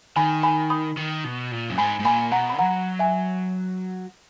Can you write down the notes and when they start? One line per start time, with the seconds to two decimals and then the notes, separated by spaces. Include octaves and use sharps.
0.16 D#3 G#5 B5
0.43 G#5 B5
0.70 B5 D#6
0.97 D#3
1.24 B2
1.52 A#2
1.70 F#2
1.78 G#2 G#5 B5
2.00 G#2
2.05 A#2 G#5 B5
2.32 B2 F#5 A#5
2.50 B5
2.59 F#3 F#5 A#5
2.99 E5 G#5